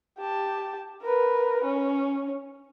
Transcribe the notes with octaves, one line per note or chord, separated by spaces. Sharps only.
G4 A5
A#4 B4
C#4